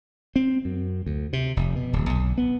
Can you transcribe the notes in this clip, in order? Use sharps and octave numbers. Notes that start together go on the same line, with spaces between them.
C4
F#2
D2
C3
F1
B2
D1
B1
B3